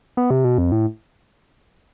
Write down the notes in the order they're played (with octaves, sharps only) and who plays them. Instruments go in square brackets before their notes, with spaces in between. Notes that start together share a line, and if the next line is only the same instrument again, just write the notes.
[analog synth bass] B3
C3
B2
F2
A2